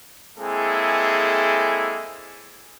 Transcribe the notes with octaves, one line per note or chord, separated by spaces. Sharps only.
G#3 A#3 C4 E4 G#4 A4